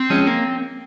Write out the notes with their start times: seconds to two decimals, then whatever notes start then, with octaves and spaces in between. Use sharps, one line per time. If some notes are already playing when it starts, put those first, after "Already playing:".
Already playing: C4
0.10 F3 G#3 C#4
0.27 A#3